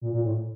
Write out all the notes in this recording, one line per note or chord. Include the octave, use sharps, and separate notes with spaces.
A#2
A#2
A2